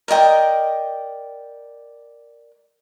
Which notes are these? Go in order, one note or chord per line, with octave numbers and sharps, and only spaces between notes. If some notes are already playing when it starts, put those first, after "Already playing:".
A#4 D5 D#5 G5